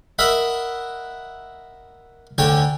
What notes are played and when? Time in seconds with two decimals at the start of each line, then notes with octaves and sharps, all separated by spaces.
0.19 A#4 D#5 E5 F#5 B5
2.38 D2 D3 C#5 G5 G#5